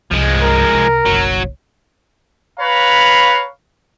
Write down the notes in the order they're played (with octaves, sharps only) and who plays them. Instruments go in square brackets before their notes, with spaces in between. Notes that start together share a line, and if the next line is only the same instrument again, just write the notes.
[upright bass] C2 G2 [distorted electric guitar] F3 G#3
[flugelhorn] A#4
[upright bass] C2
[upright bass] F#1 B1 [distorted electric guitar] F#3
[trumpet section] B4 C#5 F5 A#5 B5